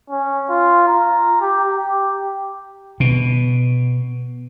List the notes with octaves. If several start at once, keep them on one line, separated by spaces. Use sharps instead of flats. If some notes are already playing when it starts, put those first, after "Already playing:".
C#4
F4
A#5
G4
G4
B2